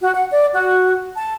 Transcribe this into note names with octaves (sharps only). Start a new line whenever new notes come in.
F#4
F#5
D5
F#4
A5